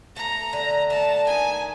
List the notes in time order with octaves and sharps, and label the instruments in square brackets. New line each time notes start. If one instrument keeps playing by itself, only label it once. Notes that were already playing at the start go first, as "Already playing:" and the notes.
[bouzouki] A3 [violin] A#5
[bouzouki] D3
[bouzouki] A3 [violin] A5
[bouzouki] D#3 [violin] G#5